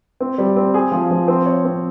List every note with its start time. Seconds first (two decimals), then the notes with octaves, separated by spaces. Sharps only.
0.21 C4
0.38 G3
0.56 C4
0.74 G#4
0.92 F3
1.11 F3
1.28 C4
1.46 C#5
1.65 C4